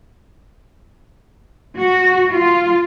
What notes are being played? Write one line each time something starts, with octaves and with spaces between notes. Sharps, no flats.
F#4
F4